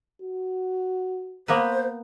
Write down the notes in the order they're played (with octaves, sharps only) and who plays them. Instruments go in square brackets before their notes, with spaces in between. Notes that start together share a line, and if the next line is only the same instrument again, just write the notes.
[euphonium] F#4
[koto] A#3 B3 B4 [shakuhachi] C5